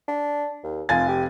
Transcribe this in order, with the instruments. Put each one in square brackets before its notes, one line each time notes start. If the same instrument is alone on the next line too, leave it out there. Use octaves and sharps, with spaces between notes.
[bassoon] D4
D#2
[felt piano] F1 G#5 A6 [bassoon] F4
[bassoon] G4